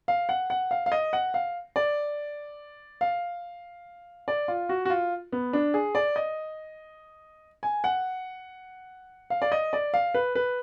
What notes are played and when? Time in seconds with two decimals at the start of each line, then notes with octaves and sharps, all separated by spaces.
0.08 F5
0.29 F#5
0.50 F#5
0.71 F5
0.86 F5
0.92 D#5
1.13 F#5
1.34 F5
1.76 D5
3.01 F5
4.28 D5
4.48 F4
4.69 F#4
4.85 F#4
4.90 F4
5.32 B3
5.53 D4
5.74 G#4
5.95 D5
6.16 D#5
7.63 G#5
7.84 F#5
9.30 F5
9.42 D5
9.52 D#5
9.73 D5
9.94 F5
10.14 B4
10.35 B4